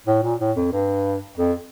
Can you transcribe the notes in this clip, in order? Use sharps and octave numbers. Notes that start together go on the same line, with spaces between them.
A2
A#2
A2
F2
G2
F2